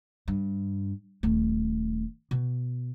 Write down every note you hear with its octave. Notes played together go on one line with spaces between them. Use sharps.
G2
D#1 A3
B2